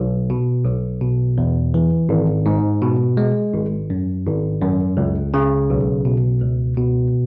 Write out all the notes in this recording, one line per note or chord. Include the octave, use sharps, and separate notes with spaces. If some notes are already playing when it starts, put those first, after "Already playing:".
Already playing: B1
B2
B1
B2
E2
E3
G#1
G#2
B2
G#3
G#1
F#2
G#1
F#2
C#2
C#3
B1
B2
C#2
B2